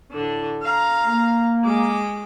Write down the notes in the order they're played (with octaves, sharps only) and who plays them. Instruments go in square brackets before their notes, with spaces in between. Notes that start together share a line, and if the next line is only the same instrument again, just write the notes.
[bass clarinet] A2 [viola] D3 D4
[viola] F5 A#5
[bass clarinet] A#3
[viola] G#3 D6